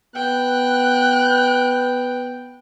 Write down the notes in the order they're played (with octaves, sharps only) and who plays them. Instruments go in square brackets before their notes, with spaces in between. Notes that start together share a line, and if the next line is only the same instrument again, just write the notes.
[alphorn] B3 [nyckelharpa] G5 [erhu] F#6